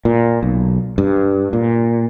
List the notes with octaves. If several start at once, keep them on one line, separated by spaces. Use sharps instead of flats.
A#2
B1
G2
A#2